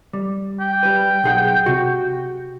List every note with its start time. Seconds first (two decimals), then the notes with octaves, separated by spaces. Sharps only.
0.13 G3
0.61 G5
0.83 G3 B4
1.24 B1 G#4 F#5
1.66 C3 F#4